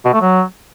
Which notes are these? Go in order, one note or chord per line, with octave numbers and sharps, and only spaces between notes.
B2
A3
F#3